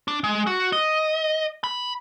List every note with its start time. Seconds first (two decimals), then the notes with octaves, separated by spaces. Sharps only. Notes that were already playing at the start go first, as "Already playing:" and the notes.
0.08 D4
0.24 G#3
0.47 F#4
0.72 D#5
1.64 B5